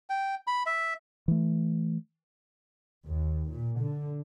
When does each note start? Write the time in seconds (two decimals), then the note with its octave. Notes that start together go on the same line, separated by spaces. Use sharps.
0.10 G5
0.47 B5
0.66 E5
1.28 E3 A3
3.07 D#2
3.50 A#2
3.79 D3